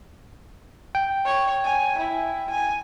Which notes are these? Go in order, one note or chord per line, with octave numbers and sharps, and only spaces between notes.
G5
C#5
G#5
E4
G#5